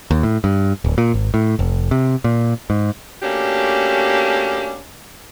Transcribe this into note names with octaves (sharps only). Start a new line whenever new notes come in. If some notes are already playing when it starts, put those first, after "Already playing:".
D#2
A2
G2
D1
A#2
G#1
A2
F1
C3
A#2
G#2
A3 A#3 C#4 D4 F#4 G4